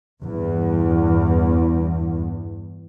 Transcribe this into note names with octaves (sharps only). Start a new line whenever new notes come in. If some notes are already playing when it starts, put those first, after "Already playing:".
E2 G2